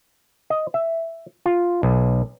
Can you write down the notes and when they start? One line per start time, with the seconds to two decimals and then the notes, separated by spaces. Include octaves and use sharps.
0.50 D#5
0.74 E5
1.46 F4
1.83 B1